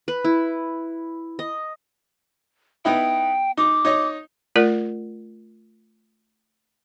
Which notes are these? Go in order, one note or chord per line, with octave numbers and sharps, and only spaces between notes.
B4
E4
D#5
B3 D#4 E4 G5
D#4 D6
D#4 C#5 D#5
A3 F4 A#4 D5